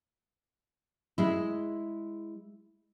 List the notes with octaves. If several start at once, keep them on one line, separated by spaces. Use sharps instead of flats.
G#3 E4